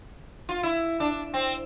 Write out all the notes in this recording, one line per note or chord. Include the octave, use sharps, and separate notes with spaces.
F4
E4
D4
C4